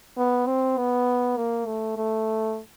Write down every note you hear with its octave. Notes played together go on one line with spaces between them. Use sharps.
B3
C4
B3
A#3
A3
A3